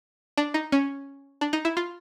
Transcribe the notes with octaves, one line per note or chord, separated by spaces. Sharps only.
D4
D#4
C#4
D4
D#4
E4
F4